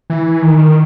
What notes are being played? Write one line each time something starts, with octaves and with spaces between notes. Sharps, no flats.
E3
D#3
D#3